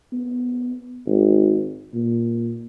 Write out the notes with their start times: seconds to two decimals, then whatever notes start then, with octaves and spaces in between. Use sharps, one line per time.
0.12 B3
1.06 G#1
1.94 A#2